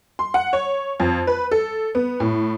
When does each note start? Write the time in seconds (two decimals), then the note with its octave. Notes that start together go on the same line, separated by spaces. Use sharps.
0.19 C6
0.34 F#5
0.53 C#5
1.00 F2
1.27 B4
1.51 A4
1.95 B3
2.20 A2